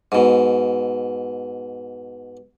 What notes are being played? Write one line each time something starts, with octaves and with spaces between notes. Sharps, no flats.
G#2 B2